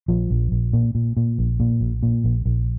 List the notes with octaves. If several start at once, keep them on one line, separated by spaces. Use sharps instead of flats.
A#1 F3
A#1
A#1
A#2
A#2
A#2
A#1
A#2
A#1
A#2
A#1
A#1